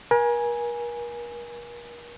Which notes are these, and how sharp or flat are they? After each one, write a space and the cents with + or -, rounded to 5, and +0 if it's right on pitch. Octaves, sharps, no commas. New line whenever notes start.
A#4 +40 G#5 +0